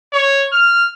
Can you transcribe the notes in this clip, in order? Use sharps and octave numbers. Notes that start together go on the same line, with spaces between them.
C#5
F6